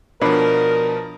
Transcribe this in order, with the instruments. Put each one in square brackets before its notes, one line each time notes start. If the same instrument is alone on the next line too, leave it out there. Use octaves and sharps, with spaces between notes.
[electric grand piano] B2 F3 [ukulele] D4 C#5 B5 [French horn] A#4